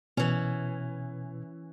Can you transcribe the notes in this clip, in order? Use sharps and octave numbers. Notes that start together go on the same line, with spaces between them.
B2 E3 C#4